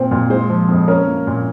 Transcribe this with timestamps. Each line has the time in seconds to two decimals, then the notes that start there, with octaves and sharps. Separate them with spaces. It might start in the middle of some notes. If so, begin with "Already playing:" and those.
Already playing: A#2 C4 C5
0.11 A#2
0.30 G#3 C5
0.50 F3
0.68 F2
0.88 C#4 A#4
1.07 A#3
1.27 A#2